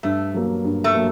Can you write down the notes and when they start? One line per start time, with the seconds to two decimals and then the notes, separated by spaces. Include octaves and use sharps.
0.03 G2 A3
0.34 F#3 A#3
0.64 G2
0.84 A3
0.95 F#3 A#3